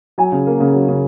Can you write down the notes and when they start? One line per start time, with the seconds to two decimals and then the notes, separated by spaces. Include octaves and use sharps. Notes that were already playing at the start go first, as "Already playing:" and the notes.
0.18 F#3 G#5
0.32 C#3
0.47 A#3
0.60 C#3
0.73 F#3
0.89 C#3